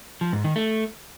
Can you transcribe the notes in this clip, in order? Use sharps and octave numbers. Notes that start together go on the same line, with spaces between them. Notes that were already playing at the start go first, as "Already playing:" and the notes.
F3
G#2
D#3
A3